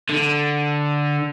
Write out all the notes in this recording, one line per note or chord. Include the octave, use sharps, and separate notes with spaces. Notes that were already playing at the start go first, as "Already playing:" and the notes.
D3